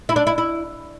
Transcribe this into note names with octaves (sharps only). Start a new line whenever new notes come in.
E4
D4
E4
E4